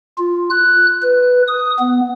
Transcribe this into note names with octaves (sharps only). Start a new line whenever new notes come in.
F4
F#6
B4
D#6
B3